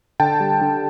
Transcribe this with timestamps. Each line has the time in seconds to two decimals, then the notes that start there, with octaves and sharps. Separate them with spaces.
0.20 D3 G5 A5
0.40 G3
0.61 D3